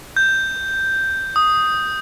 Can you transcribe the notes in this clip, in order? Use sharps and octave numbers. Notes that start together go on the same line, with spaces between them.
G6
D#6